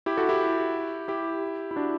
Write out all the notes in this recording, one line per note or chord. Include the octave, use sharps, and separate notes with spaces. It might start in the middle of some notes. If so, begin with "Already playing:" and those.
E4 G4
F#4 A4
E4 G4
E4 G4
E4
D4 F#4